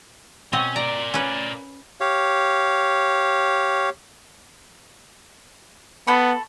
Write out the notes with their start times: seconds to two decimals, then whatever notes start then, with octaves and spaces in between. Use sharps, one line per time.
0.53 B2 C4 C#4 D#5
0.76 A#4 D5 A#5
1.14 C#4 B4
2.00 G4 C#5 F5
6.07 B3 A4 B5 C#6